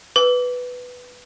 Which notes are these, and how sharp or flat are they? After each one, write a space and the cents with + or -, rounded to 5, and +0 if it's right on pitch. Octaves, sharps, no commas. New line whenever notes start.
B4 +0 D6 -30